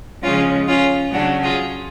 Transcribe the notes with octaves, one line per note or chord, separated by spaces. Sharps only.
C#3 F3 G#3 C#4 F4
C#4 F4
C#3 F#3 D4 F#4
F4 G#4